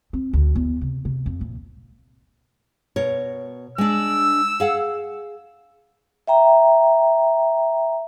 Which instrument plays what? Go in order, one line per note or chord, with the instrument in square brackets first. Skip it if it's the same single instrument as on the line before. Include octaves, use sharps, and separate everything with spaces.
[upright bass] C4
D2
E2
C3
C3
F2
A#1
[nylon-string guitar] B2 A#4 C#5
[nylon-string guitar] G#3 D4 [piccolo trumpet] E6
[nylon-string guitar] G#4 F5 F#5
[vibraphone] E5 G5 A#5